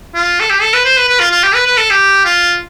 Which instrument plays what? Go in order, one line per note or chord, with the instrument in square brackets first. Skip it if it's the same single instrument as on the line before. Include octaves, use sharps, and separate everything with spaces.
[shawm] F4
A4
G4
A4
B4
C5
B4
B4
F4
F4
G4
B4
B4
A4
G4
F4